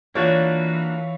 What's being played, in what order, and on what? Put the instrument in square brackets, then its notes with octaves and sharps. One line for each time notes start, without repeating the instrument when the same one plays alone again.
[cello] E3 [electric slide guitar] A#3 D4 F#4 [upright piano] F4 C#5